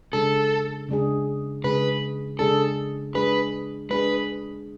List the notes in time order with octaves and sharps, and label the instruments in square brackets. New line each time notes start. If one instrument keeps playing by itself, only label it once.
[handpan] C#3 G#3 D4 G#4 [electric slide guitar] A4
[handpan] C#3 G#3 D4 G#4
[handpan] C#3 G#3 D4 G#4 [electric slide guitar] B4
[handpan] C#3 G#3 D4 G#4 [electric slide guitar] A4
[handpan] G#3 D4 G#4 [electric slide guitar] B4
[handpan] G#3 D4 G#4 [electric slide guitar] B4